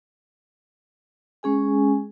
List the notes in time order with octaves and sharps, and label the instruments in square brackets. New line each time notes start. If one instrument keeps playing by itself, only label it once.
[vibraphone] G#3 C#4 G#4 G#5